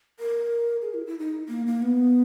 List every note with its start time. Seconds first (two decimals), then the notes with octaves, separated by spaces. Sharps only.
0.20 A#4
0.82 G#4
0.94 E4
1.07 E4
1.19 D#4
1.49 A#3
1.66 A#3
1.82 B3